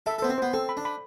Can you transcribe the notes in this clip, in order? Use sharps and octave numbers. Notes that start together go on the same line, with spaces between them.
A4 E5
A4
B3 C5
C4
B3 C5
C4 A4
B5
D4
B5